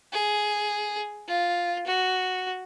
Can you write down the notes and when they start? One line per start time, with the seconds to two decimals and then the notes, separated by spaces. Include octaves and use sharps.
0.13 G#4
1.28 F4
1.87 F#4